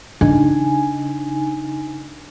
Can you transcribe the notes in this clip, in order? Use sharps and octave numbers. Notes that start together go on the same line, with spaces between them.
C#3 D4 D#4 G#5